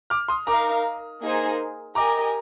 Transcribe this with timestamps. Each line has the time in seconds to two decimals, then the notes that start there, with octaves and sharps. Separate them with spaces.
0.10 D6 F6
0.28 C6 D#6
0.47 D#4 A#4 F5 A#5 D6
1.22 A#3 D#4 G#4 C5
1.95 G4 A#4 D#5 G#5 A#5 D6